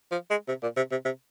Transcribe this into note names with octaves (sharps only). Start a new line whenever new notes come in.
F3
G#3
C3
A#2
C3
C3
C3